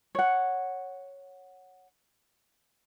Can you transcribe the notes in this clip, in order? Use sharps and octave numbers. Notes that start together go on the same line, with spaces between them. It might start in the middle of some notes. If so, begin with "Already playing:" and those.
C#5 F#5